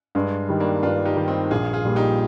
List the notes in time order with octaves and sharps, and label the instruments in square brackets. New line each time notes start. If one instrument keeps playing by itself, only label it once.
[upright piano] G2 [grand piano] G#3
[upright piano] D#3 G3
[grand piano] A#3 D4
[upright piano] G2 [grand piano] D4 F4
[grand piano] D#4 G4
[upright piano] D#3 G3
[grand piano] C4 D#4
[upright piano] A#1 [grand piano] F4 G#4
[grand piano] F4 G#4
[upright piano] A#2 G3
[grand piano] D#4 G4